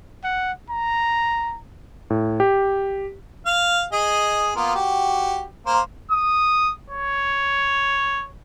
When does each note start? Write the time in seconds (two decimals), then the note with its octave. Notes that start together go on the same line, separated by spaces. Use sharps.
0.24 F#5
0.70 A#5
2.10 A2
2.40 G4
3.46 F5
3.92 G#4 D#5
4.56 A#3 B3 F4
4.75 F#4 G4
5.66 A#3 A#4 C5
6.11 D#6
6.90 C#5